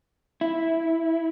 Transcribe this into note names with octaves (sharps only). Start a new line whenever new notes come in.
E4